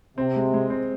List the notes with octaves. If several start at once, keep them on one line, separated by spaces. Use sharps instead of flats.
C3 C4
G#3
G#3
C4